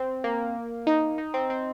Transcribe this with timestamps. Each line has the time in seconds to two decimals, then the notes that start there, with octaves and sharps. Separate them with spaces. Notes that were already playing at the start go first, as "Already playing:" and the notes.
Already playing: C4
0.24 A#3
0.87 D#4
1.18 D#4
1.34 C4
1.50 C4